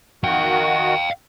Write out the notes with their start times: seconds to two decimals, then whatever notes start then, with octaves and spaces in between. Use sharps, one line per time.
0.24 D#3 F#4 F5 G5